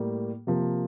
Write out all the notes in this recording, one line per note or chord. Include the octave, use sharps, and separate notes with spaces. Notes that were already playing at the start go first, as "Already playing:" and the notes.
Already playing: A2 G3 A#3
C3 F3 A#3